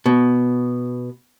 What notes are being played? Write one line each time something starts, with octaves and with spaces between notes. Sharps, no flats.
B2